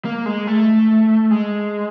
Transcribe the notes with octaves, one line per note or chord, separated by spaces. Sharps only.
A#3
G#3
A3
G#3